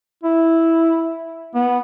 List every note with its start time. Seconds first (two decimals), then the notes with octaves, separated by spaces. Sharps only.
0.24 E4
1.55 B3